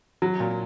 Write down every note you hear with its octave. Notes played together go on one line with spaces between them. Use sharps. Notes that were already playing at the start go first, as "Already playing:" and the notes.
F#3
A#2